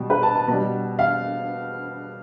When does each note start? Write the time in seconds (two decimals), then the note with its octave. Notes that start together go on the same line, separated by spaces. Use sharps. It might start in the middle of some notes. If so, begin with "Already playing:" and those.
Already playing: B2 G3
0.10 B4
0.23 A5
0.35 A5
0.48 B2 G3 A5
0.99 F5